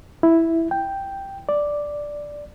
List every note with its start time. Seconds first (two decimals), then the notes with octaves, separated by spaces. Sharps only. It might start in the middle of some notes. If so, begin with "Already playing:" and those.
0.23 E4
0.71 G5
1.49 D5